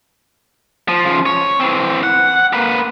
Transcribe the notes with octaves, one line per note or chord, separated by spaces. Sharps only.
F3
C#3 F3
C#5
E3 C4
F#5
A#3 B4